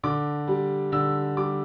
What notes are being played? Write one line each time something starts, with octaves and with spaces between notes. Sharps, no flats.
D3 D6
G3
D3 E6
G3 D6